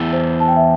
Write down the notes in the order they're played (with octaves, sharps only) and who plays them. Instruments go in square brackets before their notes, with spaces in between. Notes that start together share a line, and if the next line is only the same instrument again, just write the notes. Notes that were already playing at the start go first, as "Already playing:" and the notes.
Already playing: [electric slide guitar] E2 E3 A4
[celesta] C5
A5
G5
E5